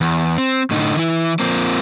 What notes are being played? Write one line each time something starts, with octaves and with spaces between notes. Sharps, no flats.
E2
C4
A2 D3 D#4
E3 E4
F3 A#3 C4